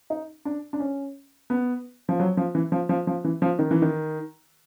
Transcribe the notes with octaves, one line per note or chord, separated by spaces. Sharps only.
D#4
D4
D4
C#4
B3
F3
F#3
F3
E3
F3
F3
F3
E3
F3
D#3
E3
D#3